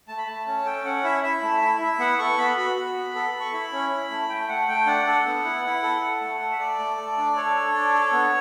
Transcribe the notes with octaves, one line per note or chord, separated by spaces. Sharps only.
A3 A5
B5
A3 A5
C#4 A5
A4 G5
C#4 F#5
E4 E5
E4 E5
A3
E4
E4
B3 F#5
A4 C#6
B3 B5
F#4 B5
F#4
B3
A4
A4
C#6
E4 B5
C#4
E4
A3
A3 G5
A3 F#5
A3 G5
D4 F#5
A4
B3
E4
E4
A4
A4
A3
A3
E5
A4 D5
A3
A3
D4
A4 C#5
A4
D4
A4
B3